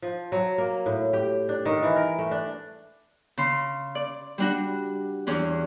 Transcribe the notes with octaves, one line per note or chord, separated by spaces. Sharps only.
F3
F#3
A#3
A2
G4
D4
D#3
E3
A#4
A3
D4
C#3 C6
D5
G3 D4 F#4
E2 C#4 D4